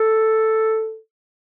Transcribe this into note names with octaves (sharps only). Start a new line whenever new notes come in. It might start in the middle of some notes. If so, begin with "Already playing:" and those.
Already playing: A4